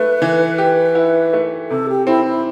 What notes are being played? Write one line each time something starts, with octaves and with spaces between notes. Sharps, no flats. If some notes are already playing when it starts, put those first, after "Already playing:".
Already playing: A3 B4
E3
G4
E4
A3
C3 A4
G4
C4 E4
E4